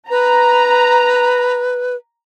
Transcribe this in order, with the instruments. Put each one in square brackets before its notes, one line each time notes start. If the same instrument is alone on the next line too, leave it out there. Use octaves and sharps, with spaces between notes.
[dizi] B4 [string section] A#5